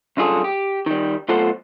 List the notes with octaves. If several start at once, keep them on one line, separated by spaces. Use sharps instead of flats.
C2 F#2 D3 F4 G#4 A4
G4
D#3 G3
B1 A3 F4 A4 C5 F#5